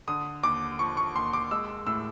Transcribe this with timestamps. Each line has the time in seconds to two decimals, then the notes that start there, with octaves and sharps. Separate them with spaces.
0.07 D3 D#6
0.43 D#2 D6
0.79 F3 C#6
0.97 C#6
1.15 D#2 C6
1.33 D6
1.51 G#3 E6
1.87 A2 E6